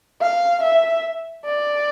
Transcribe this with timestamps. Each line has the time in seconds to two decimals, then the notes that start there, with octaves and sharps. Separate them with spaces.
0.22 F5
0.63 E5
1.46 D5